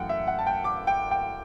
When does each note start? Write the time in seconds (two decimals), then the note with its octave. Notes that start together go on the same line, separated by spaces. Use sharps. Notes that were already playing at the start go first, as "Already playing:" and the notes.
Already playing: F#2 E3 A3 F#5 G5
0.09 E5
0.27 F#5
0.39 A5
0.47 G5
0.64 D6
0.87 G5
1.11 G5